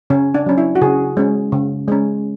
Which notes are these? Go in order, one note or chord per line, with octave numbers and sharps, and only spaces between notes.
C#3 C#4
D4
F#3 C#4
E4
F#4
C#3 G#4
G#3 C#4
C#3
G#3 C#4